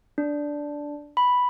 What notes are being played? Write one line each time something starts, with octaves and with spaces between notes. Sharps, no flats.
D4
B5